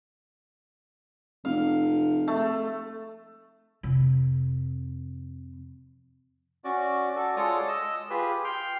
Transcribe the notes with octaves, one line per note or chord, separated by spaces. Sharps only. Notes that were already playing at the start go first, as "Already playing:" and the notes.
F1 F5
A3
F2 C3
C#4 F#4 D5
F#4 A4 D5
G#3 F4 A4 C#5 D5 D#6
D#5 E6
F4 G4 G#4 B4
G5 C6 F6